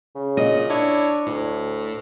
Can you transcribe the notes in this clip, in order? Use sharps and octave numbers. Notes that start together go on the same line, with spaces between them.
C#3
A#2 D#5
D4 E4 C#5
D2 A2